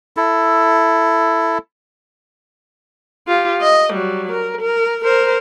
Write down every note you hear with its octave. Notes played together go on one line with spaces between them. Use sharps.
E4 A4
F4 G4
D#5
F#3 G3
A#4
A#4
A#4 C5